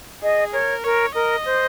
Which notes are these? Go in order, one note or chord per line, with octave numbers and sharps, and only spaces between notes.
G#4 D#5
A#4 C#5
A#4 C#5
A#4 D#5
C5